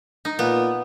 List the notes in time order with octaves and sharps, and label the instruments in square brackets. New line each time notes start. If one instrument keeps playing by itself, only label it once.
[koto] D#4
[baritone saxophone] A#2 [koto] B3